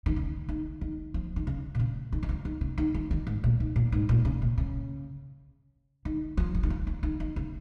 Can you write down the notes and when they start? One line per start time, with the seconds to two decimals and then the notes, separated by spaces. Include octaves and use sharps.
0.06 D#3
0.16 C#3
0.49 D#3
0.81 D#3
1.14 F3
1.36 D#3
1.47 C#3
1.75 A#2
1.79 C#3
2.12 D#3
2.23 D#3
2.29 F3
2.45 D#3
2.61 C#3
2.78 D#3
2.94 F3
3.11 D#3
3.27 G#2
3.44 A#2
3.60 D#3
3.76 A#2
3.92 G#2
4.09 A#2
4.25 C#3
4.42 A#2
4.58 C#3
6.05 D#3
6.37 F3
6.55 F3
6.63 D#3
6.70 F3
6.87 F3
7.03 D#3
7.20 D#3
7.36 C#3